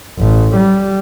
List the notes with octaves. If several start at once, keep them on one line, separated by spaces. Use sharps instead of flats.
A1
G3